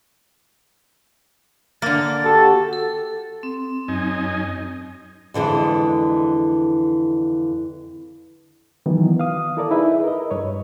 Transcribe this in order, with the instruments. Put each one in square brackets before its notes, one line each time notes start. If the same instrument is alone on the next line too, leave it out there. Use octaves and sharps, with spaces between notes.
[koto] D3 A#3 [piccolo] A6
[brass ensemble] F#4 G4 [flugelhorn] A4
[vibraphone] A4
C4
[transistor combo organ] F#2 D#4 G#5
[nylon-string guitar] F2 D3 E3 G#3
[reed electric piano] D#3 E3 F#3 B3
F5 D#6
E4 A4 A#4 D5
D#4 E4 G#4 B4 E5
A#4 D#5
G2 B4 C#5